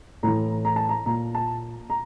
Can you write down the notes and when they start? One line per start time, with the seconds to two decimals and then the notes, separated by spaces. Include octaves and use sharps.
0.23 A2 E3 A#5
0.65 A#5
0.76 A5
0.89 A#5
1.06 A#2 A#5
1.35 A5
1.90 A#5